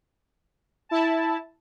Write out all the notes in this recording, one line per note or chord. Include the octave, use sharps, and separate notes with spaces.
E4 A5